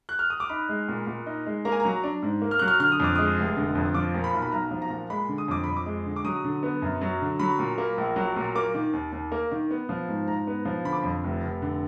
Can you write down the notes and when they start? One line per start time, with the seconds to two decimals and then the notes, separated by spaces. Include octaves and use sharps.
0.09 F#6
0.19 F6
0.30 D#6
0.40 D6
0.50 D#4 B5
0.69 G#3
0.88 A#2
1.07 A#2
1.26 D#4
1.46 G#3
1.65 A#3 A#5
1.72 G#5
1.80 F#3 A#5
2.03 D4
2.22 G#2
2.42 A#3
2.51 F6
2.59 F#3 F#6
2.68 F6
2.80 D3 F6
2.92 D#6
3.00 F2 D6
3.15 G#3 D#6
3.38 F1
3.57 D3
3.75 F2
3.94 F3 D6
4.14 A#2
4.24 B5
4.33 B1
4.42 B5
4.52 B1 A#5
4.71 F3
4.82 A#5
4.90 A#2
5.10 G#3 B5
5.29 D3
5.38 D#6
5.48 F2 D6
5.64 F2 B5
5.77 D6
5.86 G#3
6.06 D3
6.16 D6
6.24 F#3 D#6
6.44 D3
6.63 B3
6.82 F#2
7.01 F#3
7.21 D3
7.39 F#3 B5
7.59 A#2
7.78 A#3
7.98 A#1
8.16 F#3
8.36 A#2
8.55 A#3 D6
8.74 D#3
8.93 D#2
9.12 D#2
9.32 A#3
9.51 D#3
9.71 B3
9.89 F3
10.08 G#2
10.28 G#2 A#5
10.47 B3
10.65 F3
10.84 D3 B5
10.93 D6
10.99 F2 B5
11.24 F1
11.43 F1
11.62 D3